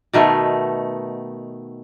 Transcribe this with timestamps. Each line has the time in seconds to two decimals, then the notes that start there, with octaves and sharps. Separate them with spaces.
0.13 B2 D#3 A3 B3